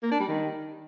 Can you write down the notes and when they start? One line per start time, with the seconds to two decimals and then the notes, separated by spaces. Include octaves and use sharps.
0.03 A#3
0.11 D4
0.20 G3
0.28 D#3